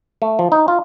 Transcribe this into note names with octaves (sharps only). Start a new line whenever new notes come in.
A3
F3
D#4
F4